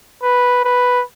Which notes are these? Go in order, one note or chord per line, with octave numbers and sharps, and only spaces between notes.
B4
B4